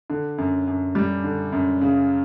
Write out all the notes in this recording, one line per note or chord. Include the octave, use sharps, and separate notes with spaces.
D3
F#2
F#2
G3
D3
F#2
C#3